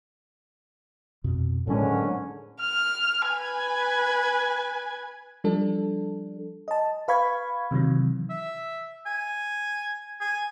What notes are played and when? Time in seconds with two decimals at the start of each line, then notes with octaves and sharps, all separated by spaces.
1.24 F2 B2
1.67 G#1 A2 D3 F#3 G#3 C#4
2.61 F6
3.27 B4 G#5
5.44 F3 G3 D4 A4
6.68 D#5 A5
7.08 B4 F5 B5 C#6 G#6
7.71 C3 D#3 E3 F#3
8.30 E5
9.06 G#5
10.21 G#5